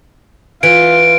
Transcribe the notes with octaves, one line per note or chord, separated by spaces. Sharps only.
E3 F4 D7